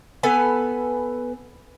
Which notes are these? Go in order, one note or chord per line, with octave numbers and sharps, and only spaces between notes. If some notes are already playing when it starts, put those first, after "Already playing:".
B3 A4 B4 G#5